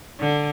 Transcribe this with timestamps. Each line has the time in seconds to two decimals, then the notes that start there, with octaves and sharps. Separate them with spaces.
0.20 D3